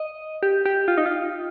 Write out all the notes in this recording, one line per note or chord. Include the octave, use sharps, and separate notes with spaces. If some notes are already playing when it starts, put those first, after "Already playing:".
Already playing: D#5
G4
G4
F4
D#4
F4